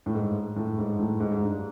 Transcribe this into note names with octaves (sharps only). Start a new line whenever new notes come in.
A2
G#2
A2
G#2
A2
G#2
G#2
G2